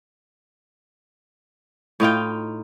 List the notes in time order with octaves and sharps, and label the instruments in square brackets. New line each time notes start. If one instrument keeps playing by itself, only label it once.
[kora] A2 D#4 F4 G5